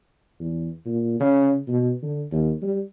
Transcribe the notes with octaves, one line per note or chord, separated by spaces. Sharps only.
E2
A#2
C#3
B2
D3
D#2
G3